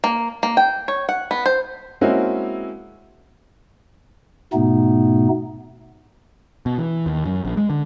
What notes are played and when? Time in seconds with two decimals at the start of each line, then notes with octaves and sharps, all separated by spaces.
0.04 A#3
0.43 A#3
0.57 G5
0.88 C#5
1.09 F#5
1.31 B3
1.46 C5
2.01 G#3 A#3 C4 C#4 E4 F#4
4.53 G#2 B2 A3 B3 D#4
6.66 B2
6.78 E3
7.06 D#2
7.25 F#2
7.45 A#1
7.57 G#3
7.70 D3